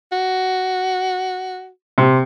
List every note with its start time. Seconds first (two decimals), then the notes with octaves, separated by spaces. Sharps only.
0.12 F#4
1.98 C3